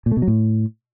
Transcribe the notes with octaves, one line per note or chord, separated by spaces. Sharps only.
A#2
A3
B2
F#3
A2